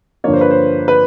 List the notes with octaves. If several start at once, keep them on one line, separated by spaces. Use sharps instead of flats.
G2 D3 F3 A#3 C#5
C5
B4
C5
B4